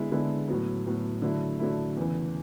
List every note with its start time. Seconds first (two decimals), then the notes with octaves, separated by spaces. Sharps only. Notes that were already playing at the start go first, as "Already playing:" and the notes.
Already playing: D3 G#3 B3 E4
0.11 D3 G#3 B3 E4
0.48 A2 F#3 B3
0.86 A2 F#3 B3
1.22 D3 F#3 A3 E4
1.59 D3 F#3 A3 E4
1.97 E2 C#3 E3